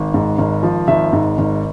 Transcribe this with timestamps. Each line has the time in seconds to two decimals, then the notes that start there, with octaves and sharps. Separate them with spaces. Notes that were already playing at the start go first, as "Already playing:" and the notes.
Already playing: G#1
0.14 G#2
0.39 G#1
0.63 F3
0.88 G#1 E5
1.13 G#2
1.38 G#1